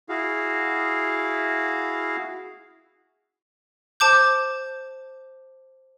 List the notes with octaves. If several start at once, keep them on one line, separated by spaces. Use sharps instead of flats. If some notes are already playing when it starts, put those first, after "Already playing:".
E4 F#4 G#4 F5
C5 A5 D6 G6